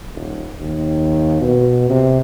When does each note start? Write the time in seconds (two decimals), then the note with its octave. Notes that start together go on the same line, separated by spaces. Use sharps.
0.15 D#1
0.60 D#2
1.41 B2
1.89 C3